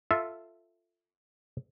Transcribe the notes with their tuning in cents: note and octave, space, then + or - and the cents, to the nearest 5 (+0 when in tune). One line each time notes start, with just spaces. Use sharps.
F4 -5 A4 +10 E5 -5